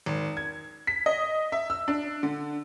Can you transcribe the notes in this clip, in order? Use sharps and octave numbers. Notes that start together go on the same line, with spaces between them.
G#1
G#6
B6
D#5
E5
E6
D4
D3